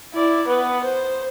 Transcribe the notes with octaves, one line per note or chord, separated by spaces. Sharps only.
E4 D5
B3 B4
C5